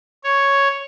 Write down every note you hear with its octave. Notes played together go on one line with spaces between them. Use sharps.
C#5